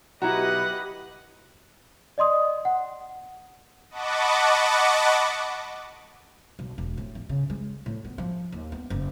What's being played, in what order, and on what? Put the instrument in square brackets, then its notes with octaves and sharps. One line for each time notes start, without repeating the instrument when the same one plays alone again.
[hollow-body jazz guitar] B1 E4 [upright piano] F#4 A#5 [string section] G4 B4 D#5 [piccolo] F#5
[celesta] D5 D#5 C6 D#6
F#5
[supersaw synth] D#5 F#5 A5 B5 C#6 D6
[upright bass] B1
E1
A2
A1
C#3
G#3
A2
B3
F3
D#2
B3
F#1